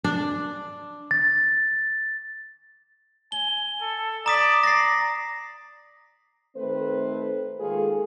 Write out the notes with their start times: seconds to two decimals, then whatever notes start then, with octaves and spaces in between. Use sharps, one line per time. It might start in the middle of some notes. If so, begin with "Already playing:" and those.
0.04 D4
1.11 A6
3.32 G#5 G7
3.81 A4
4.26 D5 A#5 D#6 B6
4.63 A#6 C7
6.56 D#3 A3 C4 B4 C5
7.59 D#3 G#3 A#3 F4 G#4 A4